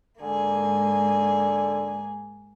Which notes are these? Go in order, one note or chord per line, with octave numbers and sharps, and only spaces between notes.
G#2 D3 A#3 G#4